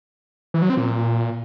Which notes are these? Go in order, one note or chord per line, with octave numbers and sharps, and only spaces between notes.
E3
F#3
C4
A#2